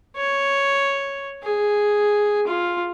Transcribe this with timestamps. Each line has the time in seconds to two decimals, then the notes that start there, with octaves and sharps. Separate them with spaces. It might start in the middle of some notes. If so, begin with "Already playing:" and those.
0.16 C#5
1.43 G#4
2.47 F4